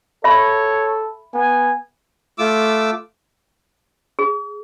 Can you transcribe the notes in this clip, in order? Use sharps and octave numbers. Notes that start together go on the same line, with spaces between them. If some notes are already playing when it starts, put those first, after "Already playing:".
A4 C#5 E5 B5
B3 G#5
A3 F4 D6 E6
G#4